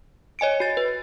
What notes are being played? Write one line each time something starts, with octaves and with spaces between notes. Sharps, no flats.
C#5 D#5 G#5 C#7 D7
F#4 A6
B4